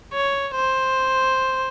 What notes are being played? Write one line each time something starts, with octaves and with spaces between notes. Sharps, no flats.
C#5
C5